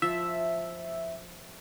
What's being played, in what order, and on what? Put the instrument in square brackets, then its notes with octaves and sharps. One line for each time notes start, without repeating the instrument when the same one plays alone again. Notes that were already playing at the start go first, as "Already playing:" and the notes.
[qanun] F3 [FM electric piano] E5